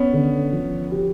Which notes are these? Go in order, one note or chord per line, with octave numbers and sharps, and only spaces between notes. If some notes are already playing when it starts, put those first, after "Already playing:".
Already playing: B3 C#4
D3
F3
G4